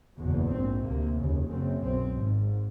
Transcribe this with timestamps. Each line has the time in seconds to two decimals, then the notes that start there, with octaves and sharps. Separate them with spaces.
0.16 F#1 E2 B2
0.49 A#1 G#2 C4
0.83 D2 C3 A#3
1.16 F1 D#2 C#3
1.49 F#1 F#2 C#3 C4
1.81 B1 B2 C4
2.14 G#1 G#2